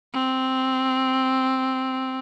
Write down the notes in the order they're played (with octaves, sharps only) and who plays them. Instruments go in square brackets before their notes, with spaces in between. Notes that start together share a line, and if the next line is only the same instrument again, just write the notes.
[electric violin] C4